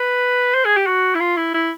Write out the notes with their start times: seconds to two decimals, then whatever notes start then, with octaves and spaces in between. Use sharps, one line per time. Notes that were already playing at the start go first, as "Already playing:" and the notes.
Already playing: B4
0.54 C5
0.65 G#4
0.77 G4
0.87 F#4
1.15 E4
1.20 F4
1.37 E4
1.54 E4